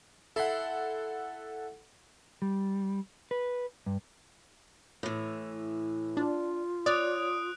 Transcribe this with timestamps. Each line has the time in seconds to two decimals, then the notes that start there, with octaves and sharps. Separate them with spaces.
0.36 E4 A4 F#5 B5 C6
2.42 G3
3.31 B4
3.86 G2
5.03 A2 E3
6.17 D4 F4
6.86 C#5 D5 D#6 F#6 D7